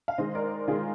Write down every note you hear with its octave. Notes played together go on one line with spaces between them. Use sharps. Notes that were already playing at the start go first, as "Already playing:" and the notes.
F5
D#3 G#3 C5 D#5
A#4 D5
D#3 G#3 F4 G#4